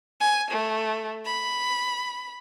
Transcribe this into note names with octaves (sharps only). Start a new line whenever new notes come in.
G#5
A3
B5